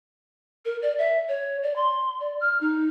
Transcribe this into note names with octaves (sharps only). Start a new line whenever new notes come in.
A#4
D5
E5
C#5
D5
C6
D5
F6
D#4